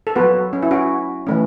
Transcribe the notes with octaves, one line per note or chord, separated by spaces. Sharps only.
A4
F#3 B3 F#4 B4
C#4
E4
C#4 F#4
E3 A3 C#4